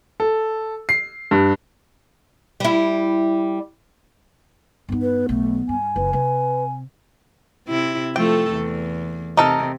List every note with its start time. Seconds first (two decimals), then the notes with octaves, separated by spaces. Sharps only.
0.20 A4
0.89 C7
1.31 G2
2.60 G3 E4
4.89 G2 B3 D#4
5.02 B4
5.29 B1 A3
5.69 G2 G#5
5.96 F#1 B4
6.13 C3 B4
7.67 C3 E4
8.16 F3 A3 A4 G5
8.52 E2
9.37 C3 D#4 A4 A#4